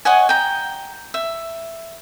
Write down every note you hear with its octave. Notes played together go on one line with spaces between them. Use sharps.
C#5 D#5 F#5 G#5
G5 A#5
E5